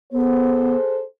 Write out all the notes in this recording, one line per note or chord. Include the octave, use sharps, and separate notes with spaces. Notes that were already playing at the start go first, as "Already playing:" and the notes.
B3 G#4 A4 C5